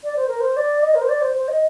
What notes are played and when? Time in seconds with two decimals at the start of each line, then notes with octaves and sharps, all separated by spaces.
0.04 D5
0.16 C5
0.28 A#4
0.40 C5
0.57 D5
0.83 D#5
0.95 A#4
1.01 C5
1.09 D5
1.21 C5
1.35 C5
1.48 D#5